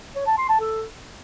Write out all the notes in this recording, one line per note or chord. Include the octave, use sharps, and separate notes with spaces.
C#5
A5
C6
A5
A4